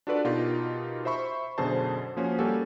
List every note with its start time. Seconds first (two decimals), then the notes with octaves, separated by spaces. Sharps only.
0.07 D4 F4 F#4 A4 B4 D5
0.25 B2 D#4 F4 G4 A#4
1.05 C5 E5 B5 C#6
1.58 F#2 B2 D3 G#4 C5 A5
2.17 F3 A#3 C#4 F#4 C5
2.39 G3 A#3 C#4 F#4 G4 A4